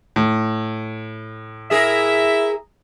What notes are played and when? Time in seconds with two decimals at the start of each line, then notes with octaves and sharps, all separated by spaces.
0.16 A2
1.71 E4 G#4 A#4 E5